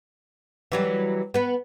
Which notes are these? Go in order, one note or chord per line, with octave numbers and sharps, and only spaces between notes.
E3 F#3 G3
B3 B4